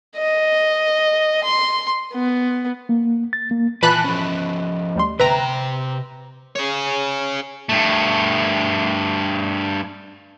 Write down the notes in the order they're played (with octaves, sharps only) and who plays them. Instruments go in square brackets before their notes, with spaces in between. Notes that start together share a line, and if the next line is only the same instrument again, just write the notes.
[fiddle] D#5
C6
B3
[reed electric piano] A#3
A6
A#3
[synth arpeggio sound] A#2 E3 [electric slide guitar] B4 G#5 [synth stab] A5 B5 F#6
[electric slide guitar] F3 C#4
[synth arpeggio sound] D2 G3 C6
[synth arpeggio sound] G1 E5 [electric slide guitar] C3 G5 [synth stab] B4 A#5
[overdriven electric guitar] G#4 C#5
[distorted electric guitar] G2 A3